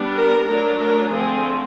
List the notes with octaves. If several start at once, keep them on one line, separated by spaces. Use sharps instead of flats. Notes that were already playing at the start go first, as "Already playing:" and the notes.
Already playing: G3 B3 D4
A#4
F#3 A3 D4 A#4
A#4
D3 F3 A3 C4 G#4